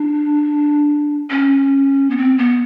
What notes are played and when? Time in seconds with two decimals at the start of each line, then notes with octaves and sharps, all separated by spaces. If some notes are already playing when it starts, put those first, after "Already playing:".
Already playing: D4
1.30 C#4
2.10 B3
2.17 C4
2.38 B3